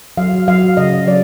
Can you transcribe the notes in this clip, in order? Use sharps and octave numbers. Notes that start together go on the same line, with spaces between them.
F#3 F5
F#3 F5
C#3 D#5
F#3 D5